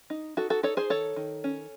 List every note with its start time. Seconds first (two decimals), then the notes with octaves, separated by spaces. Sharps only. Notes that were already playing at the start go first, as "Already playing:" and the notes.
0.10 D#4
0.37 D#4 F#4 A4
0.50 F#4 A4
0.63 D#4 A4 C#5
0.77 G#4 C5
0.90 D#3 A4 C#5
1.16 D#3
1.44 C#4